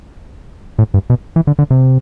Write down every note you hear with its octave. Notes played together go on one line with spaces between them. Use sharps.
A2
G2
B2
E3
D3
D3
C3